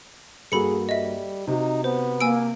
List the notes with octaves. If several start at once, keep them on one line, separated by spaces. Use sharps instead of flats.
G2 A#3 F#4 G#4 A4 B5 C#7
G3 D#5 E5
C3 D#4 F#4
B3 C5
A#3 G#5 E6 D7